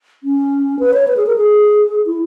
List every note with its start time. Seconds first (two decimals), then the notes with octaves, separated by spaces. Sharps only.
0.24 C#4
0.79 B4
0.94 C#5
1.08 B4
1.17 G#4
1.26 A#4
1.36 G#4
2.07 E4